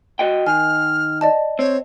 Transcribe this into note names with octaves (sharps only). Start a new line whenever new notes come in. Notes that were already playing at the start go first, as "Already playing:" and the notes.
F#4 D#5 G5
D#3 G#5 F6
D5 D#5 A5
C4 C#5